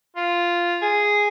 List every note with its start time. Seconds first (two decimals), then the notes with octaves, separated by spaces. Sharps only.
0.16 F4
0.82 G#4